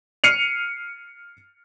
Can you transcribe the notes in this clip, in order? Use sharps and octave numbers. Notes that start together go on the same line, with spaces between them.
F6 C7 C#7 D#7 F7